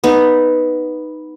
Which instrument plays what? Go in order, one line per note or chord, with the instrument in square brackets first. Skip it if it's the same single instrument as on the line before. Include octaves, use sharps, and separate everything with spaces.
[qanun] B3 D#4